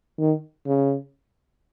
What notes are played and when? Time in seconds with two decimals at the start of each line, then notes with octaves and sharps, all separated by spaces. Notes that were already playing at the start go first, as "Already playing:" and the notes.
0.19 D#3
0.66 C#3